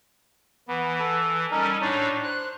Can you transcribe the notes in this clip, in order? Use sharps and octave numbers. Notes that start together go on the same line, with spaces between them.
E3 B3
A4
G3 C#4 D#4 A4 A#4
A2 D4 D#4 C#5 D5
C5 F#6